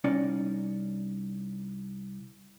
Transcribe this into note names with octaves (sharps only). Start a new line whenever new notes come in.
C2 C#4 D#4 D5